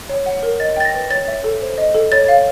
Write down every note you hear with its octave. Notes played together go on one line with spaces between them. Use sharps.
C#5
F#5
A#4
D#5 A6
G5 A6
A#6
B4
C#5 A6
E5
A4
C5
D#5
A4
C#5 A6
F5